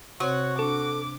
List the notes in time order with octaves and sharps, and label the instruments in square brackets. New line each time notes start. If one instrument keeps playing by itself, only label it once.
[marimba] C3 C4 C#6 [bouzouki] F#4 [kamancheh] C#5
[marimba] D4 [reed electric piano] A4 [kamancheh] D6